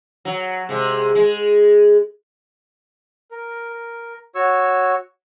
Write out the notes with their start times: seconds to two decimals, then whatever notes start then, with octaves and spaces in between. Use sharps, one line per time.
0.25 F#3
0.69 C3 G#3
1.15 G#3
3.31 A#4
4.35 F#4 C#5 C#6 E6